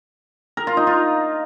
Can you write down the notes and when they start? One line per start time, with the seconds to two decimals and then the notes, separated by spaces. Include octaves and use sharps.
0.57 A#4
0.67 F4
0.77 D#4
0.87 F4